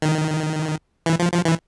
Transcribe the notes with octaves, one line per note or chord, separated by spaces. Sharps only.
D#3
E3
F3
F3
E3